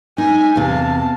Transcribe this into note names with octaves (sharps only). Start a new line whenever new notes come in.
D#4 G#5
E2 C3 F5 A5